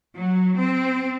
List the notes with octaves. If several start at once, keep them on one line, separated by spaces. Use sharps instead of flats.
F#3
C4